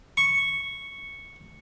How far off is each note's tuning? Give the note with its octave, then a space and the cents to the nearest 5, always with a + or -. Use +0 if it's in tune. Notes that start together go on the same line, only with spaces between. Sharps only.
C#6 -5